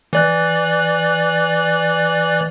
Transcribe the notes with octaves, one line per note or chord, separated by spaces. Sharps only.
E3 D5 F#6